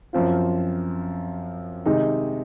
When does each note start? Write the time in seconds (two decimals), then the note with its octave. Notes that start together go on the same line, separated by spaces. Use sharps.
0.13 F#2 F3 C4 F4
1.86 C3 D#3 G#3 D#4